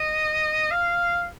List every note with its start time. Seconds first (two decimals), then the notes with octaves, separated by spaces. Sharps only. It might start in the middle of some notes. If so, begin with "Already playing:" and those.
Already playing: D#5
0.71 F5